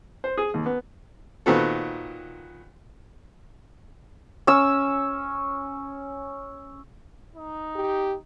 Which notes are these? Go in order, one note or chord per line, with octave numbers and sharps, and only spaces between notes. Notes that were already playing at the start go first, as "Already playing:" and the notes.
C5
G#4
D#2
B3
A#2 D#3 B3 C4 F#4 A4
C#4 E6
D#4
G4